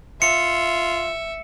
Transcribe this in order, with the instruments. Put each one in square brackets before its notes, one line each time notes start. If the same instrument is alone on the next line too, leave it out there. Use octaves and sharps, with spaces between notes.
[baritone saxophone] F4 [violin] E5 [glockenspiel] C#7